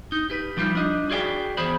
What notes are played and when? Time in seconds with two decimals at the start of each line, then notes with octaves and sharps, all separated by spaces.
0.12 D#4
0.30 G4 B4
0.57 F3 G3 D#4 F4
0.75 D4 D#5
1.10 F#4 G#4 D5 D#5 G5
1.57 E2 G#4 C5 B5